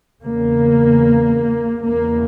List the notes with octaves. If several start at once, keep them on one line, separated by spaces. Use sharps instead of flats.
E2 C#3 A#3
E2 C#3 A#3